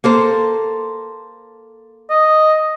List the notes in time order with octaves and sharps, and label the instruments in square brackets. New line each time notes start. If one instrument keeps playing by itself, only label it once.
[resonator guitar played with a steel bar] A#3 A4 C5
[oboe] D#5